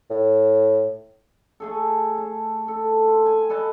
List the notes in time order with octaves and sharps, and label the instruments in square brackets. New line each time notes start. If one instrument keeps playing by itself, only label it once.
[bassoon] A2
[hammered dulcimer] A3 G#4 A4
A5
A4
F4
G#5
A4 B4 D#5 A5